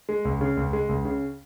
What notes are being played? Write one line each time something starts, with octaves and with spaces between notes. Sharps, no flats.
G#3
C#2
C#3
C#2
G#3
C#2
C#3